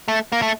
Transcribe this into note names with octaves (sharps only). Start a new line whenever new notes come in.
A3
A#3
A3